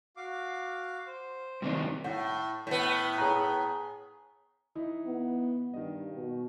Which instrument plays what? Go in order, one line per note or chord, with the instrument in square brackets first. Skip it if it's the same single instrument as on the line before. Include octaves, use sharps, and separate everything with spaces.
[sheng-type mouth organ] F#4 F5 D6
C5
[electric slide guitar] G2 C3 D#3
[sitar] A2 [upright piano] F#5
[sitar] A2 B3
[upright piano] G#4 C#5 A#5
[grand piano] E3 D#4 E4
[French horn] B3
[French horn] G2 [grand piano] D#3 D#5
[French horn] B2